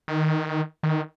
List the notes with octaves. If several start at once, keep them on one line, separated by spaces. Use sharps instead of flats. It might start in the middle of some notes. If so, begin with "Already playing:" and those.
D#3
D#3